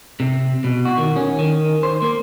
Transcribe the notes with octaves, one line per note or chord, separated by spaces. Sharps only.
C3
B2
F#4
D#3
C#4
D#3
C5
A#3